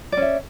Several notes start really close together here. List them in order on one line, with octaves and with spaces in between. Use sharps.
D5 C#4 E5